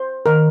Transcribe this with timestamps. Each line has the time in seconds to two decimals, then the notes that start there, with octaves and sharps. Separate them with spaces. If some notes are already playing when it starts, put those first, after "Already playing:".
Already playing: C5
0.26 D#3 A#4